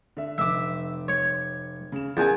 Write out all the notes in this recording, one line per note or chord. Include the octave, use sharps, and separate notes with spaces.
D3 E5
F1 E5 D6
C#5
C#3 E7
E2 C#3 A#4 G#5